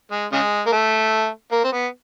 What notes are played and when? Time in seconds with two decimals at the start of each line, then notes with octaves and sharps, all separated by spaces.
0.12 G#3
0.32 C#3 G#3
0.66 A#3
0.72 A3
1.52 A#3
1.64 C4
1.72 B3